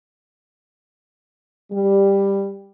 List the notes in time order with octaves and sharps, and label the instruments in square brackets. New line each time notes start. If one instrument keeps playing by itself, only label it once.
[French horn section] G3